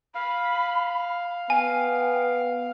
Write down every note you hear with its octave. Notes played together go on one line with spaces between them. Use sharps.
F5 B5
B3 G5 G#5